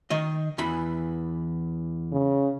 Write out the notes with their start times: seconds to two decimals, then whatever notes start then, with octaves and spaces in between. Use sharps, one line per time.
0.10 D#3 D#5
0.58 E2 E3 B5
2.12 C#3